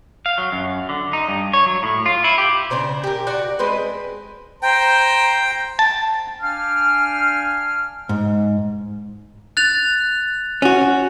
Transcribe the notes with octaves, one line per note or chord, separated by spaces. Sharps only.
F5
F#3
F#2
D3
D#4
G2
C#5
F#3
A2
F4
E4
G4
C#3 D4 C5 A#5
G4 A#4
F#4 D5 F#5
G#3 C4 B4 D#5
C5 G5 A#5
A5
D4 F5 G5 G#5 F6
G#2
F#6 A6 F7
C#4 F#4